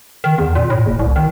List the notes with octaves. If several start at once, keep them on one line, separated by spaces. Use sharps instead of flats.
D#3
E2
A#2
A2
F#1
C2
D#3